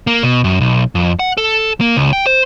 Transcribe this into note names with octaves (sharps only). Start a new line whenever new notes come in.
A#3
B2
F#2
B1
F2
F#5
A4
A#3
C#2
G5
C5